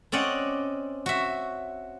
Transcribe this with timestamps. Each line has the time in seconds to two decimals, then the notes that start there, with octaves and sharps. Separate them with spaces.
0.12 C4 C#4 D5 D#5 F#5
1.06 F#4 E5